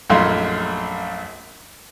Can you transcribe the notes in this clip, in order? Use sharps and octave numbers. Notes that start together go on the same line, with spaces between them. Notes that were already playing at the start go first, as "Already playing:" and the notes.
A#1 F#2 A3 D#4 F5 C6